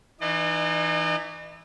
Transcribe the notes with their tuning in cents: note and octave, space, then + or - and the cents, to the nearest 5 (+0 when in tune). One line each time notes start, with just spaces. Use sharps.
E3 +0 D#4 -30 D#5 -45